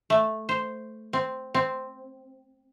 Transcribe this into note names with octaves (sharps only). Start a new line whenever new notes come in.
A3
C5
C4
C4